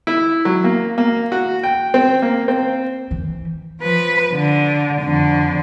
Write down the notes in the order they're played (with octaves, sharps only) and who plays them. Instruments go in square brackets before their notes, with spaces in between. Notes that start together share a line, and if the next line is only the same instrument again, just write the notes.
[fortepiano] E4
F#3
A#3
A#3
F#4
G5
C4
A#3
C4
[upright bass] E3
[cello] F3 B4
D3
F2 D3